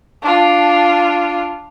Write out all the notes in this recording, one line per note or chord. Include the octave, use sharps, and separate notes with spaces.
D4 F4